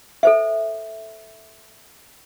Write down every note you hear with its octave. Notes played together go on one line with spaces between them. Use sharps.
A4 C5 E5